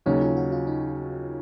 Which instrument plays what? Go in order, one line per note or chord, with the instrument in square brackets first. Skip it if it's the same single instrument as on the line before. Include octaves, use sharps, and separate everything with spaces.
[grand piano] D#2 C#3 F#3 C#4 [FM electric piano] D#4
[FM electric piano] F4
F#4
F4
D#4